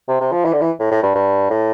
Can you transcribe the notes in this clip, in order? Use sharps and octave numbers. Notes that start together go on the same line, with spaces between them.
C3
C3
F3
E3
D3
E3
A2
A2
G2
G2
A2